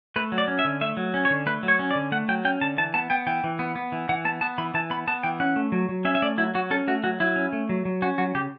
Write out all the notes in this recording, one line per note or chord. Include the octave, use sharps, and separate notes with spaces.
A3 B4
F#3
D5
C#4
E5
D3
A3 E5
F#3
C#4
C#5
D3
A3 B4
F#3
C#5
C#4
D5
D3
A3 F#5
F#3 G5
C#4 G5
D3 A5
E3 A5
B3 A5
B3 G5
E3 G5
E3
B3
B3
E3
E3 F#5
B3 A5
B3 A5
E3 B5
E3 A5
B3 B5
B3 A5
E3 G5
C#4 F#5
A3
F#3
F#3
C#4 E5
E5
A3 D5
F#3 E4
F#3 F#4
C#4 A4
A3 F#4
F#3 F#4
F#3 E4
C#4
A3
F#3
F#3
C#4 F#4
F#3 F#4
C#3 G4